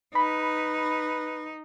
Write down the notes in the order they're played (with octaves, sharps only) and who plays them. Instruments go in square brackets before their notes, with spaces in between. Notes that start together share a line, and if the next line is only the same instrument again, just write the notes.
[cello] D#4 [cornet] B4 [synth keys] B5